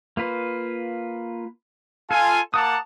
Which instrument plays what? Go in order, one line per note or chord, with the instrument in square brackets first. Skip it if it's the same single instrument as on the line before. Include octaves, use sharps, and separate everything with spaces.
[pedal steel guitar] A#3 F4 B4
[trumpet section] F4 G#5 [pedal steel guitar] A4
[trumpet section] A#3 F#5 A5 [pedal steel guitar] A#5 D6 D#6